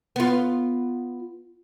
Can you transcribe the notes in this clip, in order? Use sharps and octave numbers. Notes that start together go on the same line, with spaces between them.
B3 F4